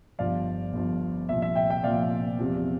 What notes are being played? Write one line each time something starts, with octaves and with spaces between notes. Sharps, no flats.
G1 G2 F3 D5 F5
G1 G2 F3
C2 A#2 F3 E5
E5
E5 G5
E5 G5
C2 A#2 F3 D5 F5
E2 C3 F3